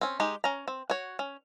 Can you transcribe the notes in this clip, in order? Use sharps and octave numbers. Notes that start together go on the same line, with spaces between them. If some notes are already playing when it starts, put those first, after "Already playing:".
C4 C#4
G#3 D#4 G4
C#4 A#5
C4
F#4 C#5
C#4